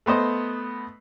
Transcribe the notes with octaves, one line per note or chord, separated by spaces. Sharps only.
A3 B3 C5 D#5